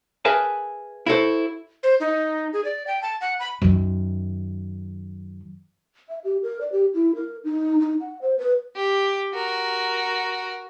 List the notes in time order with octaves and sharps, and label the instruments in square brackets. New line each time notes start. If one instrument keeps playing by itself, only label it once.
[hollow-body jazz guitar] G#4 A#4 B4 E5 G#5 A5
E4 F#4 A4 C5
[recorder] C5
D#4
G#4
D5
G5
A5
F#5
B5
[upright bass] F#2 D#3
[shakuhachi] E5
G4
A#4
D5
G4
E4
A#4
D#4
D#4
F#5
C5
B4
[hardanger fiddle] G4
F#4 A#4